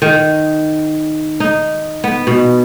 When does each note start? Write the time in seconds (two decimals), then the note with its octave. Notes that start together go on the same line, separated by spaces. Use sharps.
0.02 D#3
1.40 D#4
2.04 B3
2.27 B2